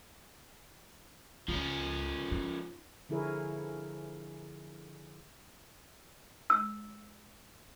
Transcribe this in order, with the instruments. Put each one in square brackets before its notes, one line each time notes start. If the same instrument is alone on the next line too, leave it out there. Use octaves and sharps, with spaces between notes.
[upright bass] C#2 [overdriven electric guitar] F3 C#4
[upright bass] D#4
[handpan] D3 F3 E4 G#4 A#4 C#5
[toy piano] E6